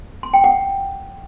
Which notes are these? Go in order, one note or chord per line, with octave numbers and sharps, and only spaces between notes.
C6
G5
F#5